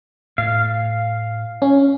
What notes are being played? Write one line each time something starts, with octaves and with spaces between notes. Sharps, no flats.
A2 F5
C#4